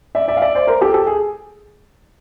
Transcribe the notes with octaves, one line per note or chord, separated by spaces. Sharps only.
D5 E5
D5 E5
F5
D5 E5
C5 D5
A#4 C5
G4 A4
G4 A4
G#4